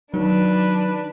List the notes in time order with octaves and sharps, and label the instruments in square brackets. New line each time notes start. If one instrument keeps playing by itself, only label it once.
[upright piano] D#3 [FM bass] F#3 [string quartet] D4 [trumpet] B4